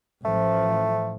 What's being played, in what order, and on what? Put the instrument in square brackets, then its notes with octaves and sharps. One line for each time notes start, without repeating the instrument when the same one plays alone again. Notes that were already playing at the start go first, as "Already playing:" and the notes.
[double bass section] A1 F3 [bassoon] A3